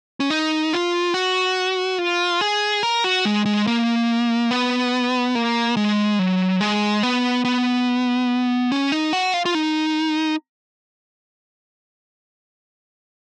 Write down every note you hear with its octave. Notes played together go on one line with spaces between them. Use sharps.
C#4
D#4
F4
F#4
F4
G#4
A#4
F#4
G#3
G#3
A#3
B3
A#3
G#3
F#3
G#3
B3
B3
C#4
D#4
F#4
F4
F4
D#4